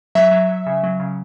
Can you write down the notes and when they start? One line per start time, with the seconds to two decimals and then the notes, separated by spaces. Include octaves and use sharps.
0.15 F#3 E5
0.31 F#3
0.49 F#3
0.66 C#3
0.83 F#3
1.00 C#3